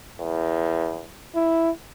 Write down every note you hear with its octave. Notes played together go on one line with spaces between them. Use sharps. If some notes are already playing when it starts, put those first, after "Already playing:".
E2
E4